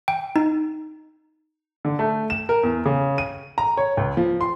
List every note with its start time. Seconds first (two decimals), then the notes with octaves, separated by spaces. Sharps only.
0.08 G5
0.36 D#4
1.85 D3
1.99 A3
2.30 E7
2.49 A#4
2.63 E2
2.86 C#3
3.18 D#7
3.58 A#5
3.77 C#5
3.97 C#2
4.17 F3
4.41 C6